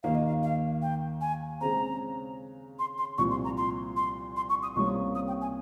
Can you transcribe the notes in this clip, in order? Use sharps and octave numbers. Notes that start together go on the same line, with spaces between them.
D#2 D#3 A#3 D#4 F5
D#5
F5
F5
G5
G#5
C#3 G#3 C4 A#5
C6
C6
C2 A#2 F3 C#6
C6
A#5
C6
C6
C6
C#6
D#6
C2 C3 G3 A#3 C#4 C#6
D#6
G5
G#5